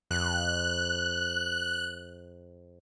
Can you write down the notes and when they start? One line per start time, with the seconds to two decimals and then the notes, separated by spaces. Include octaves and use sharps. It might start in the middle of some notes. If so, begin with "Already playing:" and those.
0.11 F2 F#6